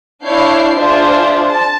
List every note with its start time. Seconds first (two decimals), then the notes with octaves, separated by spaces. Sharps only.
0.24 D4 E4 C#5 F5 G6 C7
0.76 D4 F4 G#4 C5 E5
1.49 A5